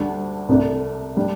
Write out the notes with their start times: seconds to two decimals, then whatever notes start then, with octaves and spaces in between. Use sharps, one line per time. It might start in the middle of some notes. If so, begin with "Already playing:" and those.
Already playing: D2 D3 G3 D4
0.49 C2 C3 A3 D4
1.17 G3 D4